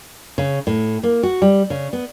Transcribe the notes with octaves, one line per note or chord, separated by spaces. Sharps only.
C#3
A2
A#3
F#4
G3
C#3
B3